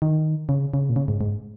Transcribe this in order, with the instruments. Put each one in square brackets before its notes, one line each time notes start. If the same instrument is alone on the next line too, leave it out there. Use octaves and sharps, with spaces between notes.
[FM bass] D#3
C#3
C#3
A#2
C#3
G#2
G#2